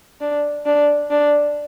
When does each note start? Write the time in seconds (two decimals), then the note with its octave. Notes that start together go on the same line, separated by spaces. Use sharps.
0.21 D4
0.65 D4
1.10 D4